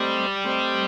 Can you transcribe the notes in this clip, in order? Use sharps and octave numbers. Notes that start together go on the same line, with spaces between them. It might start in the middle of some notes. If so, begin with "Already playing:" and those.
Already playing: G3 A3 C4 G4 C5 D#5
A3 C4 G4 C5 D#5